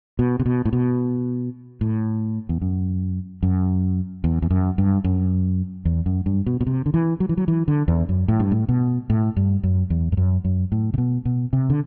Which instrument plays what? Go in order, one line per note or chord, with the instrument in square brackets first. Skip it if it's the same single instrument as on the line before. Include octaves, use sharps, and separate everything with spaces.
[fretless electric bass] B2
C3
B2
A2
B2
A2
E2
F#2
F#2
E2
E2
F#2
G2
F#2
E2
F#2
G2
B2
B2
C3
D3
E3
F#3
E3
F#3
E3
D3
E2
F#2
A2
G2
A2
B2
A2
G2
F#2
E2
G2
F#2
F#2
A2
C3
B2
B2
C3
D3